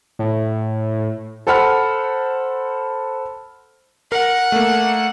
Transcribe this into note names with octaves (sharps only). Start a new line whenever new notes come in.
A2
A4 C5 F#5 B5 F6
A#4 F#5
A3 A#3